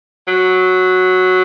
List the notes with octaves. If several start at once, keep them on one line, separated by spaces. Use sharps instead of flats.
F#3